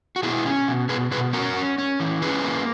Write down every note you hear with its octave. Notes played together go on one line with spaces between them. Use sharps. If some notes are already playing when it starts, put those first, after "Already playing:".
F#4
B2 E4 G#4
C#4
B2
B2 G#4 B4
B2 G#4 B4
C#4 F#4 A#4
C#4
C#4
E3
C#4 G#4 B4
A#3